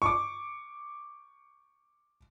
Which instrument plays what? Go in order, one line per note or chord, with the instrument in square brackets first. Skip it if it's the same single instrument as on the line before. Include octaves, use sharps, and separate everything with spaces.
[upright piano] C#6 D6